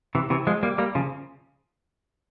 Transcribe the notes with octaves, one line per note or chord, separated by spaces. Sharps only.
C3 E3
C3 E3
F3 G#3
G3 A#3
G3 A#3
C#3 F3